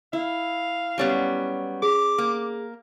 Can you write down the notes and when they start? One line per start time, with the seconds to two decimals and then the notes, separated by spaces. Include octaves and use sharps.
0.13 E4 F5
0.98 F#3 G3 B3 C#4 C#6
1.83 G#4 D6
2.18 A#3